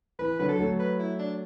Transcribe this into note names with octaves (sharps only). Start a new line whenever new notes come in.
E3 B4
D3 F#3 B4
A4
F#3 A3
B4
E4
D4